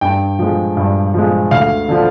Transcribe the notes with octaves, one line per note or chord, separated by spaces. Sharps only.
G2 G5
F3 G#3
G2
F3 G#3
D2 F5
D3 F3